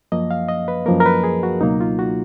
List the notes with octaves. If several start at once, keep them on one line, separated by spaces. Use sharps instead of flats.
F#2 F3 A#3 D#5
F5
D#5
B4
F#2 F3 A#3 A#4
A#4
B4
G#4
F#4
C#2 B2 F#3 A#3 D#4
F4
F#4